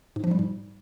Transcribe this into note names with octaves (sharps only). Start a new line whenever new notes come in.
G#2
F3
G3
G#2